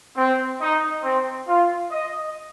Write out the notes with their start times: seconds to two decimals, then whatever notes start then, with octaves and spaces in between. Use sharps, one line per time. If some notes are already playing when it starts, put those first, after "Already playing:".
0.16 C4
0.60 D#4
1.03 C4
1.47 F4
1.91 D#5